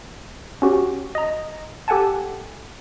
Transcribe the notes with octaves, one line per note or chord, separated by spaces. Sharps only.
C#4 F#4 G4
D#5 A#5
G4 A4 F#5 G#5 A5